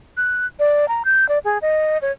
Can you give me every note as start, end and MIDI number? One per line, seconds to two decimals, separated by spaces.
0.17 0.46 90
0.59 0.88 74
0.88 1.03 82
1.05 1.27 91
1.29 1.39 74
1.45 1.58 68
1.62 1.98 75
2.02 2.12 73